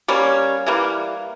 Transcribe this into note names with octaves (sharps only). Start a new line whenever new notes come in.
G3 A#3 C#4
E3 G3 A#3